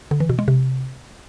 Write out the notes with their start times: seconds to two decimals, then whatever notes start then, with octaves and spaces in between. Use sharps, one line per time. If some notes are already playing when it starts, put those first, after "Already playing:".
0.11 D3
0.20 E3
0.29 B2
0.39 G#3
0.48 C3